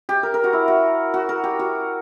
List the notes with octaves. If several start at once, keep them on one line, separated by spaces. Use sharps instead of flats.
G4
A#4
A#4
F#4
E4
F#4
F#4
A#4
G4
F#4